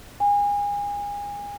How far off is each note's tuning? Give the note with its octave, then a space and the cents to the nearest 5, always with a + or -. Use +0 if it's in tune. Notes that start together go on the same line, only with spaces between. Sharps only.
G#5 -30